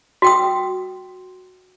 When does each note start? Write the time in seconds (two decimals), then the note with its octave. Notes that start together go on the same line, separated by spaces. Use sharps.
0.22 F#4 G5 D#6